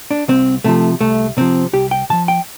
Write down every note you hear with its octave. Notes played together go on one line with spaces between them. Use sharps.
D4
C2 C4
C3 F3 A3
C2 A3
C3 F3 C4
C2 G4
G5
C3 F3 A5
G5